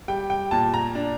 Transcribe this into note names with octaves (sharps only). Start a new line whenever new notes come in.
G3 G5
G5
A#2 A5
A#5
D4